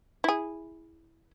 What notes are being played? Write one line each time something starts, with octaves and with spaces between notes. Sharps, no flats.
E4 G#4